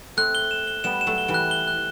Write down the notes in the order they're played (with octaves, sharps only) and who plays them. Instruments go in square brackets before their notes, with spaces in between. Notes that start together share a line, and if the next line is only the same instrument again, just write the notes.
[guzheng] A3 C4 [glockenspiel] F#6
[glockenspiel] G7
E7
G7
[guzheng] G3 B3 [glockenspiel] E7
[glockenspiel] E7
[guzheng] F#3 A3
[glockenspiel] G7
[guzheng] E3 G3
[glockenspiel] F#6
G7
F#6